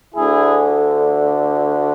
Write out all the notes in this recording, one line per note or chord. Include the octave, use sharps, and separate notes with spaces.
D2 D3 A3 E4 G#4